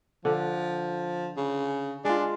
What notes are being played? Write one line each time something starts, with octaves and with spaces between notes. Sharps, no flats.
D3 F3
C#3
G#3 D4 F4